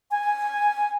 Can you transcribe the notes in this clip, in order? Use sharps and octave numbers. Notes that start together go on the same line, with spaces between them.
G#5